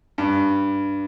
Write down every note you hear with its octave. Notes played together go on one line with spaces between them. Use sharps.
G2